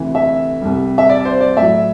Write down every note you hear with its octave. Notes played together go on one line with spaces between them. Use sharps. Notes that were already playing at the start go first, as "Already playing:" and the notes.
Already playing: D2 C3 E3
E5
C2 C3 G3
E5
D5
C5
D5
A2 F#3 E5